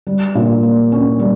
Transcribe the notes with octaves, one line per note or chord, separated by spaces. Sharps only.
G3
A#2
A#3
C#4
G3